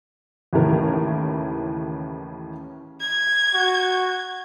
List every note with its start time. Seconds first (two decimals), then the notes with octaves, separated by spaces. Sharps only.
0.53 D#2 A2 C#3 E3 A#4
3.01 G#6
3.54 F#4